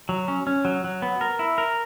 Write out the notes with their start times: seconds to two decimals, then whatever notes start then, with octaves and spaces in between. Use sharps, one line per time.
0.09 F#3
0.28 C#4
0.47 C#4
0.65 F#3
0.84 F#3
1.02 B3
1.21 A#4
1.39 E4
1.58 A#4